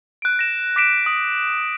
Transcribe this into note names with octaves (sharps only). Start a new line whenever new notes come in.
F#6 D7
A#6 E7
D6 A#6 B6 D7 E7
D#6